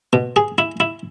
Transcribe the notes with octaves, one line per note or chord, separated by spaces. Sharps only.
B2
G#4
E4
E4